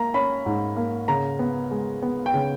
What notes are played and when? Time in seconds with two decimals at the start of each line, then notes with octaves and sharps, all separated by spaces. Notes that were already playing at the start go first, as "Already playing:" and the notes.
Already playing: A#3 A#5
0.14 C#4 B5
0.46 G#2
0.76 A#3
1.08 C#3 A#5
1.39 B3
1.71 G#3
2.02 B3
2.26 G5
2.34 C#3